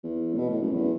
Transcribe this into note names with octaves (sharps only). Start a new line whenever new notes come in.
E2
A2
B2
A2
F#2
E2